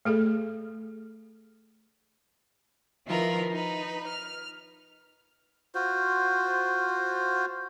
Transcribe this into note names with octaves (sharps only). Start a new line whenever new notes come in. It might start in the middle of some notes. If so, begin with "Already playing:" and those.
A3 G#4 A4
D#3 F3 E4 F4 A#4 B4
D#4 B4
F6
F4 F#4 C5